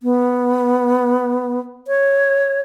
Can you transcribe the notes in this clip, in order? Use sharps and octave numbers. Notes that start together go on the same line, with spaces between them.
B3
C#5